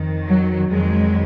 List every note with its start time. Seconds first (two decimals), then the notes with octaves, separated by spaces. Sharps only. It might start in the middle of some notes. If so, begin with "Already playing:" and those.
Already playing: F2 D#3
0.28 F#3
0.70 F2 D#3 F#3 G#3